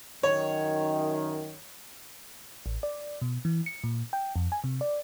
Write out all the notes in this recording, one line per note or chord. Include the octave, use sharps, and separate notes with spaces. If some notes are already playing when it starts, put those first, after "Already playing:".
F#2 D#3 C#5
A1
D5
B2
E3
C#7
A#2
G5
F2
G#5
C3
D5